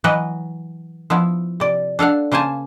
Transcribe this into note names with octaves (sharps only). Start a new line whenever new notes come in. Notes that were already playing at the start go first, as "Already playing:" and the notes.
E3 F#3 B4 D#5 F#5
F3 B3 E4
C3 D5
D4 A4 F5 F#5
C#3 A#3 C5 G#5 A5